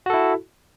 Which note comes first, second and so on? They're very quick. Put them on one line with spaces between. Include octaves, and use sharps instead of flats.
F#4 A4 E4